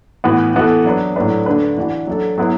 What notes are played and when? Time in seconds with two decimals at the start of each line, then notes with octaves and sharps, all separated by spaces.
0.24 A2 E3 B3 F#4 B4
0.55 E3 B3 F#4 A4
0.85 F#3 D4 B4
1.16 A2 F#3 A3 D4 B4
1.46 D3 A3 D4 B4
1.78 E3 D4 F#4
2.07 F#3 D4 A4
2.38 F#3 B3 E4 B4